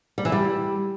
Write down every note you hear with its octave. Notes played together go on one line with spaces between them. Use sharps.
G3
E3
G3